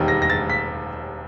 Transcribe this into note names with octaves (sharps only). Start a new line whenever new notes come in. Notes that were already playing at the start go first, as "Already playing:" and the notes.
Already playing: E1 D#2 D#3 G3
A#6
A#6
A6
B6